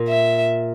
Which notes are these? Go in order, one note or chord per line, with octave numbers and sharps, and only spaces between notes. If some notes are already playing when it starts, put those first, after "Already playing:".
Already playing: A#2
E5